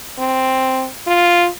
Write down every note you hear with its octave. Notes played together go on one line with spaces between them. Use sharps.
C4
F4